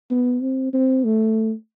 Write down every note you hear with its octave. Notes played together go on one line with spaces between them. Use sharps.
B3
C4
C4
A3